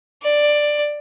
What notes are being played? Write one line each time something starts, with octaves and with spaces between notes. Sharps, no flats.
D5